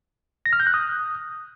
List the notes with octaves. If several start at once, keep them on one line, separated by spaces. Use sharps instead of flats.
A#6
F6
G6
F#6
D#6